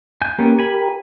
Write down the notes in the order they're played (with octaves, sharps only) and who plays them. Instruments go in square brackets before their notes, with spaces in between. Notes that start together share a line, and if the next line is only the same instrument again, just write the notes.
[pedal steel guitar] G#5 G6
[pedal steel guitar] A#3 B3 C#4 [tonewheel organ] G4 A#4
[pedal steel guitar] G#5 B5